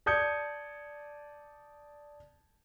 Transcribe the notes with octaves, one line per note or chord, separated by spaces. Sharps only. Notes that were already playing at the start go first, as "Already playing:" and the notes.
D5 A5 D#6 G6 G#6 C#7